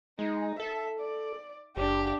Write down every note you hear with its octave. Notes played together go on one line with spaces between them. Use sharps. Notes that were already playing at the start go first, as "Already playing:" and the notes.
G#3 D#4
A4 E5
D5
F#1 D4 G4